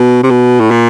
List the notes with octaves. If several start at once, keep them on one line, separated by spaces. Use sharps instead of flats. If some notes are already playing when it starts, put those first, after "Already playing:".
Already playing: B2
C3
B2
A2
A#2